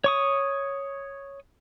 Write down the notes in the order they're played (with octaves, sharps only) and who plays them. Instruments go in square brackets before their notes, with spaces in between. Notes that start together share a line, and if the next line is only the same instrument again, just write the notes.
[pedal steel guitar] C#5 C#6 D#6